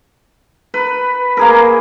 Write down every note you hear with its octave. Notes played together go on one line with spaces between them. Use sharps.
B4
A#3 G#4 A#4